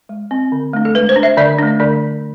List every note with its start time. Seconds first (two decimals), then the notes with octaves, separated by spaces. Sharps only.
0.09 G#3
0.31 C4
0.52 D3
0.73 A3 D4
0.85 A4
0.95 G#3 B4
1.09 C5
1.16 D4
1.23 E5
1.37 D3 D5
1.58 A3 D4
1.80 D3 D5